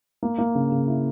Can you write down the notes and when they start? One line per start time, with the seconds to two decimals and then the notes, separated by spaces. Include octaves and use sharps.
0.23 A#3
0.38 A#3
0.55 C#3
0.72 C#3
0.87 E4